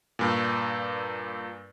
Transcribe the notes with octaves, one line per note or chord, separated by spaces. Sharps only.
G2 A#2